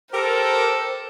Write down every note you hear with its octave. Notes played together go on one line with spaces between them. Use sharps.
G4 A4 A#4 C5